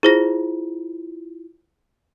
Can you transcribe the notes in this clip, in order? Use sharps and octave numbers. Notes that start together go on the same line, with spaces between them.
E4 F4 G#4 C5 A#6